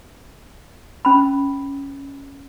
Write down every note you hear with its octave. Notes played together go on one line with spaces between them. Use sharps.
C#4 B5